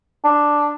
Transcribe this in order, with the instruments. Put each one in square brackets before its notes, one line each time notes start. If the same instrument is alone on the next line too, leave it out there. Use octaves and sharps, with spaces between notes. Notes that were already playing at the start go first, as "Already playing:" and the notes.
[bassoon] D4